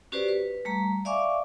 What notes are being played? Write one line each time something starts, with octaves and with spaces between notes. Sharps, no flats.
C#4 F#4 G4 B4 C5 D5
B4
G3 A3 A#5
D5 E5 F5 G#5 C#6 D6